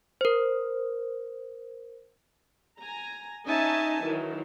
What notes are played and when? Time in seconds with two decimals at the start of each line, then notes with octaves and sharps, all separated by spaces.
0.21 A#4 C5
2.81 G#5 A#5
3.47 C#4 D#4 D#5 E5 G#5 A5
4.04 D#3 E3 F#3